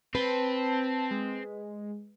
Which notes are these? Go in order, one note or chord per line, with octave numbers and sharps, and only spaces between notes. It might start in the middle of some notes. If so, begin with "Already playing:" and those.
C4 B4 A5
G#3